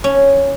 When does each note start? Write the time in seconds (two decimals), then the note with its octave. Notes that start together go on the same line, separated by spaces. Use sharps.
0.04 C#4